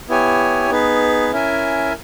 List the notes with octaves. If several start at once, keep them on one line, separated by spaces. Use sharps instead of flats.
B3 E4 G4 C#5 G#5
B3 D#4 G#4 B4
C#4 E4 A#4 E5 G#5